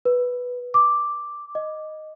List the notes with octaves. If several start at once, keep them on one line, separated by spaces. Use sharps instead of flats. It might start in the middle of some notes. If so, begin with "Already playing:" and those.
B4
D6
D#5